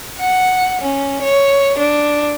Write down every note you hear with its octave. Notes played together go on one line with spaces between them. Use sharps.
F#5
C#4
C#5
D4